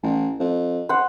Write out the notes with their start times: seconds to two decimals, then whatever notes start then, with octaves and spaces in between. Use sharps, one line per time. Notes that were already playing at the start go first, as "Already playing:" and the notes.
0.03 A1
0.39 F2
0.89 C5 F#5